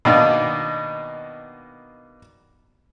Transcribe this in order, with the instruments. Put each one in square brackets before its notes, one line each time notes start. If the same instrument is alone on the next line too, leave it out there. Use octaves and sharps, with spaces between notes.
[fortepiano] B2 D#3 A#3 D4 D#4